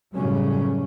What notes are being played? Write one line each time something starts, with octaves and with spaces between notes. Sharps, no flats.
F#2 A2 C#3 F#3 G3 C#4